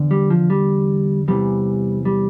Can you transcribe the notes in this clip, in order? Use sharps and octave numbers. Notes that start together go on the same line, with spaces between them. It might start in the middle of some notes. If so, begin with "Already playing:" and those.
Already playing: E2 D3
G3
F3
G3
E2 C3 E3 G3
G3